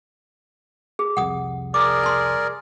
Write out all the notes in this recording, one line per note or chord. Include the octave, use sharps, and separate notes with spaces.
G#4
C2 F2 F#5 D#6
G#4 A#4 D5 D6
A5 C6